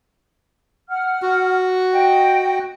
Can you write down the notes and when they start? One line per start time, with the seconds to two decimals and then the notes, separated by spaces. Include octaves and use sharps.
0.88 F#5 F6
1.22 F#4
1.91 D#5 G5